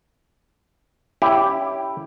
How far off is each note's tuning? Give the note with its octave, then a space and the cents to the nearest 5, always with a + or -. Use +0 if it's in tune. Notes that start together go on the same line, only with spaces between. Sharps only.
C#4 +25 E4 +0 G4 +0